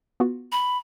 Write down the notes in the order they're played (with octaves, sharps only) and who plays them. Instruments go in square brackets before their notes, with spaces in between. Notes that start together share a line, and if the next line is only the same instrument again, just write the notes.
[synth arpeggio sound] B3 F4 F#4
[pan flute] B5